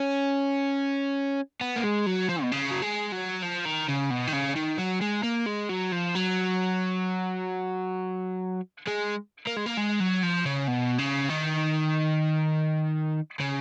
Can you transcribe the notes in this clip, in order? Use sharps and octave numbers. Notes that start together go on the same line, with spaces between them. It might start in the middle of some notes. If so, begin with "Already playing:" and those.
Already playing: C#4
B3
A#3
G#3
F#3
F3
B2
C#3
F#3
G#3
F#3
F3
D#3
C#3
B2
D#3
C#3
D#3
F#3
G#3
A#3
G#3
F#3
F3
F#3
G#3
A#3
G#3
A#3
G#3
F#3
F3
C#3
B2
C#3
D#3
C#3